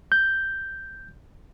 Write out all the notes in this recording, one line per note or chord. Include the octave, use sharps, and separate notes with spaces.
G6